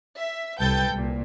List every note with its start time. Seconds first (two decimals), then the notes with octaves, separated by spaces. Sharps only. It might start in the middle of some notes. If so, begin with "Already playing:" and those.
0.16 E5
0.59 C2 A4 B4 G5 G6 A6
0.92 C2 A#2